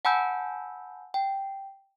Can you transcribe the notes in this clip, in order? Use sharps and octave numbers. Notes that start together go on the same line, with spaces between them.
F#5 G#5 A5 B5 E6 G6
G5